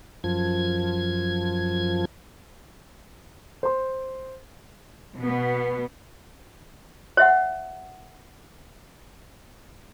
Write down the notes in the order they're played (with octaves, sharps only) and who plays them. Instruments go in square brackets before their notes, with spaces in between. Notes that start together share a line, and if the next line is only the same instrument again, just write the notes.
[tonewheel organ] F#2 F3 G#6
[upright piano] C5 C6
[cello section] B2 B3
[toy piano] C#5 E5 F#5